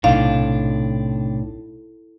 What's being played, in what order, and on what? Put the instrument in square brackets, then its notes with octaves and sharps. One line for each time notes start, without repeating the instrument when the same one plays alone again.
[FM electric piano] B1 D#4 [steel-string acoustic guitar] A2 [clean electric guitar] C3 D4 [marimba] F5